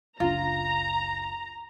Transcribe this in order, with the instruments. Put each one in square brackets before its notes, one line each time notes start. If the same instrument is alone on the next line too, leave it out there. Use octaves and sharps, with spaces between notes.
[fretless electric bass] F#1 C#2 D4 [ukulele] F4 [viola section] A#5